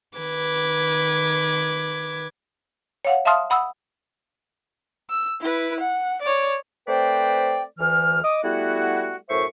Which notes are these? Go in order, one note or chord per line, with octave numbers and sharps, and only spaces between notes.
D#3 B4 D6 G#6
C#5 F5 F#5
E5 F5 A5 C6 D#6 F6
F#5 B5 D#6 E6
E6
E4 B4
F#5
C#5 D5
A3 C4 B4 C5 D5 G5
D2 E3 F6
D#5 D6 D#6
G3 A3 B3 E4 F#4
F#2 A2 C5 E5 C#6